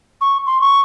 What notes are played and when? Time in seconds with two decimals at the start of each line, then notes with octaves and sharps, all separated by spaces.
0.21 C#6
0.46 C6
0.61 C#6